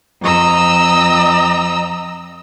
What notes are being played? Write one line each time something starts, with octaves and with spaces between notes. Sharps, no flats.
F2 D#5 A#5 E6